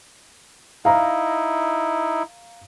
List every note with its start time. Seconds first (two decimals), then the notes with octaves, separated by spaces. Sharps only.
0.85 D#4 E4 F5 A#5